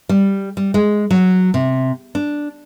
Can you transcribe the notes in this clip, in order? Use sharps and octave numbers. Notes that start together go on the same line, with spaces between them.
G3
G3
G#3
F#3
C3
D4